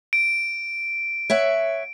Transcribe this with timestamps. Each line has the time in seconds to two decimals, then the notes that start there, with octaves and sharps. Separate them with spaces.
0.13 D7
1.30 C#5 E5 F#5